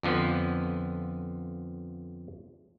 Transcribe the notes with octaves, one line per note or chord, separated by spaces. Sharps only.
F2 D3 F3 B3